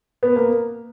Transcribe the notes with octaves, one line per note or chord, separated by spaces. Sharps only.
B3
A#3